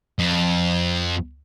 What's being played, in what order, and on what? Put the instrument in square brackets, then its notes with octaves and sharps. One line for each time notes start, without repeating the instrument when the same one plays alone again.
[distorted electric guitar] F2